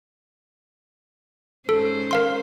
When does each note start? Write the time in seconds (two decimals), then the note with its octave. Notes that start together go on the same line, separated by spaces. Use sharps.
1.69 G#2 C#4 A4 C5
2.11 A#4 F5 C6